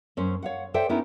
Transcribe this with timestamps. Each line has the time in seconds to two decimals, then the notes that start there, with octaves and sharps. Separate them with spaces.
0.17 F#2 C#4 C5
0.42 C#5 F5 F#5
0.74 A4 C5 D5 E5 G5
0.89 B3 C#4 D#4 E4 A#4